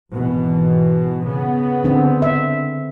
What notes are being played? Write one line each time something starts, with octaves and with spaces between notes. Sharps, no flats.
G#1 B2 E3
C#3 B3
D3 C4
E5